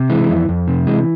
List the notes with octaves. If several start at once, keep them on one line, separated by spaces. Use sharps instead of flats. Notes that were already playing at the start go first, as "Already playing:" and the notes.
Already playing: C3
E3 G#3
F2
F2
C3
E3 G#3